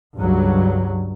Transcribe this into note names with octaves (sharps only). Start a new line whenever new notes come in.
C#2 G2 F#3